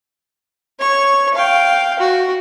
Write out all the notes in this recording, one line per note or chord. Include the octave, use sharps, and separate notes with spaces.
C#5 C#6
F5 G5
F#4